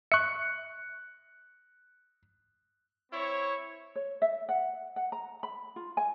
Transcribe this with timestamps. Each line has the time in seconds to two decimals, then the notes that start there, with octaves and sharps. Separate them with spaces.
0.12 E5 C#6 F#6 C#7
3.12 C4 E4 C#5
3.95 C#5
4.22 E5
4.49 F#5
4.96 F#5
5.12 A#5
5.43 B5
5.76 F4
5.97 G#5